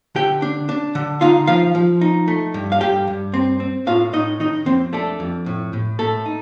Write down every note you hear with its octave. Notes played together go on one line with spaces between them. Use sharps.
D3 G4 G5
D4
D4
D3
D#4 F4 F5
F3 F4 F5
F3
D#4
A3
G2
F5
G2 G4 G5
G2
C4
C4
A2 F4 F5
A2 D#4 D#5
D#3 D#4 D#5
F2 C4 C5
A3 D4 A4
F2
A2
A2
A2 A3 A4
D#4